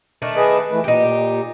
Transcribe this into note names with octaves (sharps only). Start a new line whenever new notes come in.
D#3 A3 D4
G#4 B4 D#5
E3 A3 B4
A#2 D#4 G4